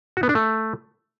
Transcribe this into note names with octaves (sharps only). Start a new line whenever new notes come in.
F#4
B3
D4
A3